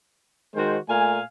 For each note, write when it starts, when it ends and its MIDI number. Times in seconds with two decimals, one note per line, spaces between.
0.54 0.76 51
0.54 0.76 56
0.54 0.76 66
0.54 0.76 72
0.88 1.20 46
0.88 1.20 57
0.88 1.20 77
0.88 1.20 80